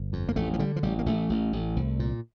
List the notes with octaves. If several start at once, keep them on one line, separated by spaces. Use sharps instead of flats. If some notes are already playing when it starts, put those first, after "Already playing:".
Already playing: G1
F2
A#3
A1 A3
F3
D3 G3
F3
A1 G3
A#3
A1 A3
A1
A1
C2
A#2